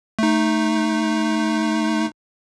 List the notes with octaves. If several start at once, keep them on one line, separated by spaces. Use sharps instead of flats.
A3 D#4